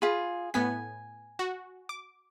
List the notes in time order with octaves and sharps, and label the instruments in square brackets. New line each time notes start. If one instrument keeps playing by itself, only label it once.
[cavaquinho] F4 G#4 [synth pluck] B5
[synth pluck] A2 B3 B6 [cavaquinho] G#5
[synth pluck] F#4
D6